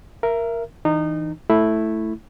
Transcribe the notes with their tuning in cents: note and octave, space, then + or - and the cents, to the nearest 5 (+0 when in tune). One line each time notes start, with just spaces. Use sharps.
A#4 +0 E5 +25
E3 -20 D#4 -25
A3 +0 E4 +0